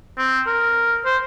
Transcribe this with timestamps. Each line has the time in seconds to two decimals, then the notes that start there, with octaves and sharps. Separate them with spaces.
0.18 C4
0.46 A#4
1.05 C5